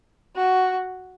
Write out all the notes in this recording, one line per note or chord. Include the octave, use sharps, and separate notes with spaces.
F#4